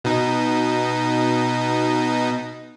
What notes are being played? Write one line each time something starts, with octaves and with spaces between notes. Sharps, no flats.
B2 D#4